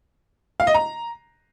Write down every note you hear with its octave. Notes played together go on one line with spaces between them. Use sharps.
F5
D#5
A#5